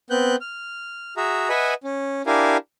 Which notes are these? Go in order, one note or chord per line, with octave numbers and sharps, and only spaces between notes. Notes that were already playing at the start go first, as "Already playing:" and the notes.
B3 C4 F#6 G6
F6
F#4 G#4 E5 A#5
B4 D#5 E5 F#5 G#5 B5
C#4
D4 E4 G4 A#4 F5 G#5